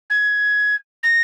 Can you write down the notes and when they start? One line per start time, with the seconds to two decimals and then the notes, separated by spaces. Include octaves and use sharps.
0.09 G#6
1.03 A#6